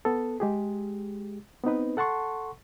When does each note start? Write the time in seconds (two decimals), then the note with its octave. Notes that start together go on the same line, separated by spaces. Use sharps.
0.05 B3 A4
0.40 G#3 G4 G#4
1.63 B3 C4 D#4 B4
1.97 A4 F#5 A5 C6 C#6